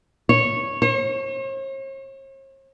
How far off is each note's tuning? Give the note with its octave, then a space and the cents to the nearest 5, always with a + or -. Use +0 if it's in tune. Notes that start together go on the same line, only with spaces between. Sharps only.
C#5 -10
C#5 -45